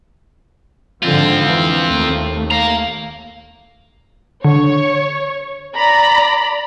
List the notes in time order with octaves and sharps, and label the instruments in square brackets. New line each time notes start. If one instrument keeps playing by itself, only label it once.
[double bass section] G#2 D3 F3 [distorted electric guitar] C4 F4
[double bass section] E3
D#2 A3
[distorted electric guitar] F5 A#5
[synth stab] D3 [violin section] C#5
[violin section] D5 A#5 B5